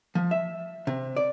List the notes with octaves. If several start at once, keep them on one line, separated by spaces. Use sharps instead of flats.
F3
E5
C3
D5